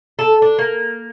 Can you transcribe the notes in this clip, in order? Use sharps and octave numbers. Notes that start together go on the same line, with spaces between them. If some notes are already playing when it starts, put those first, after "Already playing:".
A4
D4
A#3